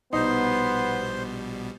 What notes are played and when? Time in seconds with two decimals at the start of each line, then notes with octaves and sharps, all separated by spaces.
0.13 A#1 B2 G3 B3 D#4 C5 C6